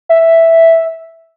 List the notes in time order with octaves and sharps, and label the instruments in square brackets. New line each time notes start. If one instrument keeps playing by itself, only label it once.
[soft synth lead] E5